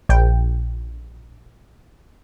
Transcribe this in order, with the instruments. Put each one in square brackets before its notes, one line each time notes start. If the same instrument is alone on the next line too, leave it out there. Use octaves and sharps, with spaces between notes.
[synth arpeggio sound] A#1 G5